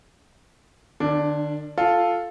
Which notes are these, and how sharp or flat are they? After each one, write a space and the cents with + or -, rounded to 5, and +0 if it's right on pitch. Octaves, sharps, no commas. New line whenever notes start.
D3 +45 D4 +0
F4 +0 A4 +0